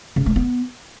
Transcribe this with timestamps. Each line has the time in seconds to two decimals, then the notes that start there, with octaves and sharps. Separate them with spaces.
0.16 C#3
0.26 A3
0.36 B3